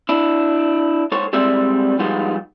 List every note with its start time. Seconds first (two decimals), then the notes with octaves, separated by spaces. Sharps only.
0.09 D4 E4
1.12 G#2 A4 C5 C#5
1.33 G3 G#3 C4 D5 E5
1.99 F3 G3 G#3 B3 D#4 F4